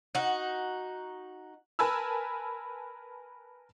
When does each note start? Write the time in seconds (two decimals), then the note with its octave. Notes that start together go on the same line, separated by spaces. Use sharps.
0.15 D#4 F#4
1.79 A#4 B4 G#5 A5 B5 E6